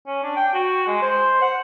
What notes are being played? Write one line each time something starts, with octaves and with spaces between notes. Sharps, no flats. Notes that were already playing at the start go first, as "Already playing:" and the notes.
C#4
D4
G5
F#4
G#3
C5
F#5